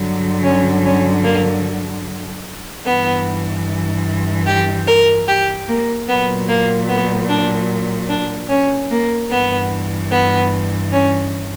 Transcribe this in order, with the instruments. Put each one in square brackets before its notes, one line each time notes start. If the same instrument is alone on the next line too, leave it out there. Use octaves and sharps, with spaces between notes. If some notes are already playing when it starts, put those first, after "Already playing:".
Already playing: [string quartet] G2 D3 F#3
C#4
C#4
A#3
G2 E3 B3
G4
A#4
G4
A#3
A#2 F#3 B3
A#3
B3
D4
D4
C#4
A#3
G2 E3 B3
B3
C#4